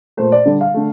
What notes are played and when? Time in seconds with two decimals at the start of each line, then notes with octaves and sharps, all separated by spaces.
0.17 A#2 A3 C5
0.32 D5
0.45 D3 G3
0.61 F5
0.74 D3 A3